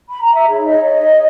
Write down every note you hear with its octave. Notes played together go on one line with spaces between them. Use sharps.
B5
A#5
E5
D#4 G#4 C#5
D#5
C#5
D#5